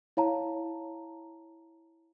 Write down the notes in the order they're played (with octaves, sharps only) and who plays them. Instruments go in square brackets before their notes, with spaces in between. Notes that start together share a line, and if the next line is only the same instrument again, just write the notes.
[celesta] E4 C#5 F5 A5 A#5